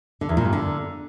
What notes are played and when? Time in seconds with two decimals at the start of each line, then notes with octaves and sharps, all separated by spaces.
0.21 D3
0.29 E2
0.37 A#2
0.45 G2
0.53 D3